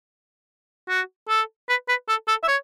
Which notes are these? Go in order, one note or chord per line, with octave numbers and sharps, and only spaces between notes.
F#4
A4
B4
B4
A4
A4
E5
C#5